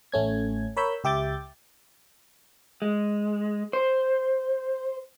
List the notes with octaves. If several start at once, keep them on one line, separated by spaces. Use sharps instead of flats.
A1 A3 C#4 G#6
A#4 C#5 B5 E6 G6
C#2 G4 E5 D6 G6 A6
G#3
C5